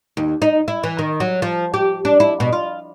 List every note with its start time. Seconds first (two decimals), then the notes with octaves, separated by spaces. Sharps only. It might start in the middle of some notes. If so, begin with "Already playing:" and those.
0.17 D#2
0.42 D#4
0.68 E4
0.83 E3
0.99 D#3
1.20 F#3
1.42 F3
1.74 G4
2.05 D4
2.20 E4
2.40 B2
2.53 F4